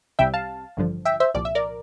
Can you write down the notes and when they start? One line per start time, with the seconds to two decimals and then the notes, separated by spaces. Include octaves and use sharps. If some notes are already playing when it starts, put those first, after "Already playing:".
0.19 C2 C3 G3 E5 G5
0.34 F5 A5
0.77 A1 G2 D3 F3
1.05 E5 G5
1.20 C5 E5
1.34 C2 A#2 F3 D5
1.45 E5
1.55 A#4 D5